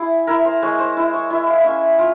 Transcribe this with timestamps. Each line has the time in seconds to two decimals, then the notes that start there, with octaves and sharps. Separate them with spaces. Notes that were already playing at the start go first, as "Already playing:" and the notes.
Already playing: E4 G#4
0.27 E4 A#4
0.45 C5
0.62 G#3 C#5
0.79 C5
0.97 E4
1.13 C#5
1.30 E4 E5
1.48 F5
1.64 C#4 E5
1.99 F4 E5